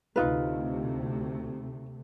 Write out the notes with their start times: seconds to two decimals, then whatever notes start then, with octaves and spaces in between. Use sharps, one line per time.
0.16 D2 C3 A3 D#4 F4 B4